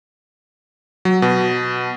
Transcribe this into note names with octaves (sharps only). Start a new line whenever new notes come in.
F#3
B2